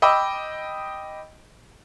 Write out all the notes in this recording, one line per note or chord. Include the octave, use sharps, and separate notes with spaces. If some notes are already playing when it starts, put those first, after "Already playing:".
D#5 G5 B5 D6 E6